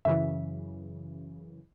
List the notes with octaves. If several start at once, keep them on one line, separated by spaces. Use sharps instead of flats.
F#2 C#3 E3 E5